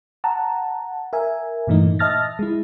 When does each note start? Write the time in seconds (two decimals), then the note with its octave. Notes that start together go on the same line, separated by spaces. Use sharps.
0.24 F#5 A5 A#5
1.13 A#4 E5 G#5
1.67 G2 A#2 E3 A3 D#4
1.99 D#5 E5 A5 F6 A6 A#6
2.39 G#3 E4